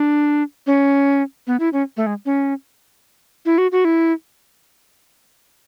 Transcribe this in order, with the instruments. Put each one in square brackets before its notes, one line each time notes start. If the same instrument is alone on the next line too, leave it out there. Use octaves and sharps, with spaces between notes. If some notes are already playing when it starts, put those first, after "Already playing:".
Already playing: [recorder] D4
C#4
B3
E4
C#4
A3
G#3
C#4
E4
F#4
F#4
E4